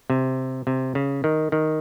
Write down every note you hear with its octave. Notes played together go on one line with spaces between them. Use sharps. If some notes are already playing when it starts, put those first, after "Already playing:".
C3
C3
C#3
D#3
D#3